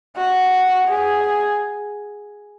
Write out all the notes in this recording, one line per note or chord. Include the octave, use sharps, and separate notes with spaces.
F#4
G#4